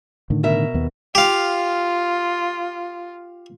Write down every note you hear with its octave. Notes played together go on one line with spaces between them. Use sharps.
A2 D3 D#3
B2 A#4 E5
D#2 B3
F4 G4 F5